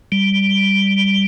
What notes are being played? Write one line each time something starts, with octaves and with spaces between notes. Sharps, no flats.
G3